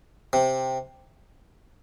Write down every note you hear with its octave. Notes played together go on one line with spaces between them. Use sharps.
C3